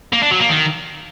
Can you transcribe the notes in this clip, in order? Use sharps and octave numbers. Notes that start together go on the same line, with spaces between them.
A#3
D4
F#3
A#3
D#3